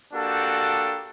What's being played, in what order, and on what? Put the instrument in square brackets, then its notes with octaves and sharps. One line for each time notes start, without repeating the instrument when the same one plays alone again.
[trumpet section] A#3 D4 F#4 G4 A4